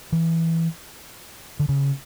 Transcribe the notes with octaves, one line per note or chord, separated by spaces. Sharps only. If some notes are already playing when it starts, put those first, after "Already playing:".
E3
D3
C#3